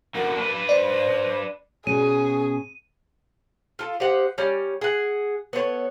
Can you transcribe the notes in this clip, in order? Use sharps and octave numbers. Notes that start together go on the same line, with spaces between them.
D3 A#3 F#4 A#4
D4 B4
C5 D5
B2 C#4 G#4 D#7
F4 A4
G4 C5 D#5 F#5
G3 C#4
G#4 F#5
B3 A4 C5 C#5